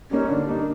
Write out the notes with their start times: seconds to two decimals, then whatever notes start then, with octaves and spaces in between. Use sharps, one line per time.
0.10 G3 A#3 C#4 D#4
0.29 D3 D4
0.47 G3 A#3 D#4